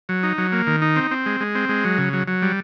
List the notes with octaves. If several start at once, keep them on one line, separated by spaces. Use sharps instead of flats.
F#3
D#4
F#3
A#3
D#3
D#4
C4
C4
G#3
G#3
C4
G#3
F#3
C#3
F#3
F#3
G3